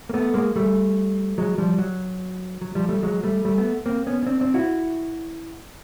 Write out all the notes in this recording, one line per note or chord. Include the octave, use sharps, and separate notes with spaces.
A#3
A3 B3
G#3 A#3
G3 A3
F#3 G#3
F3 G3
F#3
F#3
F3 G3
G3 A3
F#3 G#3
G3 A3
G3 A3
A3 B3
A#3 C4
B3 C#4
C#4
C4 D4
C4 D4
E4 F#4